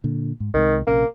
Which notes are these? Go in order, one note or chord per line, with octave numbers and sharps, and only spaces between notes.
A#2 D3
G#2
C2 C3 D#3 G#3
A#1 C3 A#3 C#4